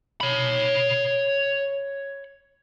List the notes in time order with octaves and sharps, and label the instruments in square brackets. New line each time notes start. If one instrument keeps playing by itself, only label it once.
[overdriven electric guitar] C#5 B5